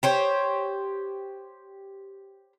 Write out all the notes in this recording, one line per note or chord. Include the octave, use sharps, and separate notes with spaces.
G4 C5 C#5